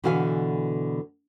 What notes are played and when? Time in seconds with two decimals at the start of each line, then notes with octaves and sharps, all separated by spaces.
0.04 B2 D3 E3 F#4 F5 G#5